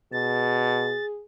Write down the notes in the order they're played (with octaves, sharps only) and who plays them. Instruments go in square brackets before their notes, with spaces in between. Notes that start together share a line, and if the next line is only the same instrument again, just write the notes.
[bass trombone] B2 [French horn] G#4 [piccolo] A6